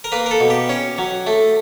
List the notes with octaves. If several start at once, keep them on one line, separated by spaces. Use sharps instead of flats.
A#4
A#3 B4
A#4
A4
B2
G4
C#4
F#3
A3